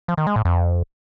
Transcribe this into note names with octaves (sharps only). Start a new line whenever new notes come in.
F3
D#3
G#3
A2
F2